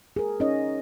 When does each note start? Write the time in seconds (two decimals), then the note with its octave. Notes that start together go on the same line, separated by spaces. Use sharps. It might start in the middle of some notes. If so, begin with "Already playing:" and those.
0.16 G#4 A#4
0.40 C#4 D#4 C#5 D#5